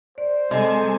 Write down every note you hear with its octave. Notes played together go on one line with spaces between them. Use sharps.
C5 D5
C3 G#3 A4 D#5 G#5